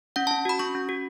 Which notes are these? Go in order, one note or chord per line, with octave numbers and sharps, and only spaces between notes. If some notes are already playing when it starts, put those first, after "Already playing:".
C#4 F#5
A5
C#4
F#4 B5
C#4 C#6
C#4
F#4